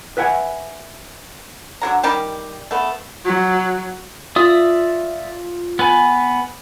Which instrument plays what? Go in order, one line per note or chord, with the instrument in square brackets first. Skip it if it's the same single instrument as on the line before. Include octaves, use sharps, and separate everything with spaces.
[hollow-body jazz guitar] B4 E5 F#5 G#5
[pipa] D3 F#3 A#5
D#3 G3 G4
A3 B3
[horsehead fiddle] F#3
[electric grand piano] F4 [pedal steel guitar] D5 E5 D#6
[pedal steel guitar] B3 B4 G#5